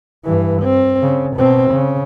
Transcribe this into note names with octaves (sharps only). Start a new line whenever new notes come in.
G2 E3
C4
C#3
B2 C4
C#3